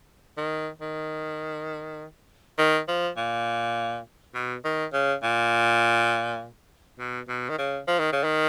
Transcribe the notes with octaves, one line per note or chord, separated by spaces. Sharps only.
D#3
D#3
D#3
F3
A#2
B2
D#3
C#3
A#2
B2
B2
D#3
C#3
F3
D#3
C#3
D#3